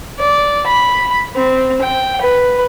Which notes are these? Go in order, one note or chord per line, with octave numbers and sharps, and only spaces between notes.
D5
B5
C4
G5
B4